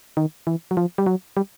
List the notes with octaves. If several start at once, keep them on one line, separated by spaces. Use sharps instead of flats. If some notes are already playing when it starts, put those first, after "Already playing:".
D#3
E3
F#3
F3
G3
F#3
G3